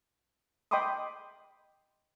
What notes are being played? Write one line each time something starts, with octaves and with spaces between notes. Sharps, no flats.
D#5 G5 B5 C6 D6 D#6